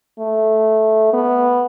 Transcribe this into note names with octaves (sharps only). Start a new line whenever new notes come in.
A3
B3